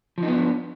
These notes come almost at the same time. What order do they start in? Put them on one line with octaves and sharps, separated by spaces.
F3 D#4 B3 D4